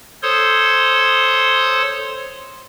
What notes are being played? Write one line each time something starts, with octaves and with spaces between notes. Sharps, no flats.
A4 C5 C#5 C6 D#6